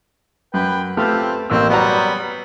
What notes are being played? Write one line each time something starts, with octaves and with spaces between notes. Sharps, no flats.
F#2 B4 G5
A3 B3 C4 F4 G4 F6
A1 A#3 C4 E6
F#3 G3 B3 D5 F#5 A#5